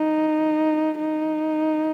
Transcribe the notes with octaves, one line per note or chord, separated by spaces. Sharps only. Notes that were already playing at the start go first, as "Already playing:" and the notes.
Already playing: D#4
D#4